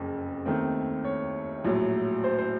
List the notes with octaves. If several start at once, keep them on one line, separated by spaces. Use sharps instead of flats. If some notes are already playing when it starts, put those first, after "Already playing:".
Already playing: F#1 F2 C#3
D#2 D#3 A3 C4
C#5
A#1 A2 F#3
C5
C5